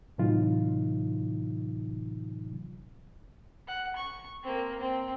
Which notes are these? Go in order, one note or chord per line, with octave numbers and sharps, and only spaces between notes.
A2 C3 E3 F#3 D#4 F4
F#5
C#6
A#3 C4
C4